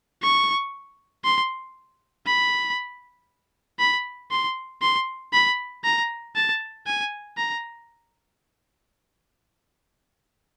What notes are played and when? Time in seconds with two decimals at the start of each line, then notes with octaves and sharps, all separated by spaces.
0.22 C#6
1.24 C6
2.26 B5
3.79 B5
4.31 C6
4.82 C6
5.33 B5
5.84 A#5
6.35 A5
6.87 G#5
7.37 A#5